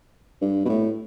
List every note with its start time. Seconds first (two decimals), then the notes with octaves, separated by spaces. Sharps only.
0.41 G2
0.65 B2
0.69 A2